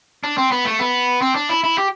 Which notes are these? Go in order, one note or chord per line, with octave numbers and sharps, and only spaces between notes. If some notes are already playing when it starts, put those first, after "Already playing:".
D4
C4
B3
A3
B3
C4
D4
E4
E4
G4